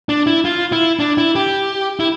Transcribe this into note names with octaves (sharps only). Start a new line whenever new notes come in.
D4
E4
F4
E4
D4
E4
G4
E4